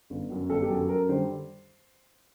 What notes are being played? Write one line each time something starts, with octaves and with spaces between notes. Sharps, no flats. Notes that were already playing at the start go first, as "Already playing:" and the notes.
G1
F#2 F#3
G1 A4
G4
F#2 F#3
A4
F#2 A#4
D3 G3 C5